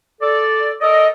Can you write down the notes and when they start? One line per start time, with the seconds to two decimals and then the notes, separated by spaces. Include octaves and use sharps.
0.21 A4 D5
0.81 A4 A#4 D5 D#5